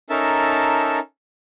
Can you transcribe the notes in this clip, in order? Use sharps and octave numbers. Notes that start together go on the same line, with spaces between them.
C#4 D#4 A4 A#4 E5 A5